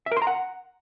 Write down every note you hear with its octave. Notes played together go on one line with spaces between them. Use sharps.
E5
A#4
C6
A#5
F#5